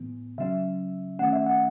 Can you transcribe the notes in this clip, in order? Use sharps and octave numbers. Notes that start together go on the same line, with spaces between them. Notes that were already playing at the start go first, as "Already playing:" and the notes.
Already playing: A2 E3 B3
C#3 F#3 C#4 E5
D#3 A3 C#4 F#5
E5
F#5